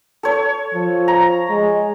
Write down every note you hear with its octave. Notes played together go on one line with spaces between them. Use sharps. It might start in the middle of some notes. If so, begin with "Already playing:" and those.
A4 C#5
F3
A#5
G#3